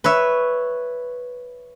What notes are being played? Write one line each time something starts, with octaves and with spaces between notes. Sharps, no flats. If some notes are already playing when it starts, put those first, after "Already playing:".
B4 C#5 E5